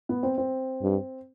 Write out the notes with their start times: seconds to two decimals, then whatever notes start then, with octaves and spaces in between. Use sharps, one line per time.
0.09 B3
0.23 C4
0.38 C4
0.82 G2